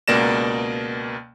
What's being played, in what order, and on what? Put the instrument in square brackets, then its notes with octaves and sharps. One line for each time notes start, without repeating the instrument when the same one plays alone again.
[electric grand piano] C#2 B2 A#3 D5 A#6 E7